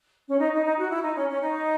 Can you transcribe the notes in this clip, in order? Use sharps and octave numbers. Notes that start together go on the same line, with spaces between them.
C#4
D#4
D#4
D#4
F#4
E4
D#4
C#4
C#4
D#4